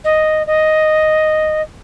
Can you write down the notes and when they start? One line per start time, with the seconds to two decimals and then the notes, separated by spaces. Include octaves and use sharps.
0.04 D#5
0.46 D#5